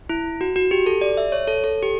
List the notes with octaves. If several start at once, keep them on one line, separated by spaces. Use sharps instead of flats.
E4
F#4
F#4
G4
A4
D5
E5
C#5
A4
A4
G4